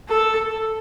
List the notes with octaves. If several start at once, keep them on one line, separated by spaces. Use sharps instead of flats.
A4